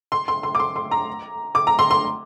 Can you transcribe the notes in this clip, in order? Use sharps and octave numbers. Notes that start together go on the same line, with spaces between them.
C6
C6
C6
D6
C6
C6
A#5
D6
A#5
C6
C6